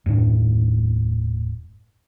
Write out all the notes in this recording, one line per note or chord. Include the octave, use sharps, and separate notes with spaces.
D#1 F#2 A2 D4